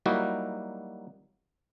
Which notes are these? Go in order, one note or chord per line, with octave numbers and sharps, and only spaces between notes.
F#3 G3 A#3 D#4 E4 F#4